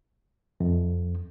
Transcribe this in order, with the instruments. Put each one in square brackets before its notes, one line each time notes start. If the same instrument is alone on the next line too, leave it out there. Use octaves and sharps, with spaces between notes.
[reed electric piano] F2